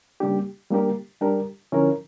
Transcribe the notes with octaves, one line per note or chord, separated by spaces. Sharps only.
C#3 G3 A#3 D4 G4
G3 A#3 D4 G4 A#4
G3 D4 G4 A#4
D3 F3 C#4 E4 A#4